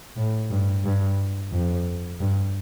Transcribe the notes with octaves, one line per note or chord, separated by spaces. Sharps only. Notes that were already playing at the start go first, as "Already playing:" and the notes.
A2
G2
G2
F2
G2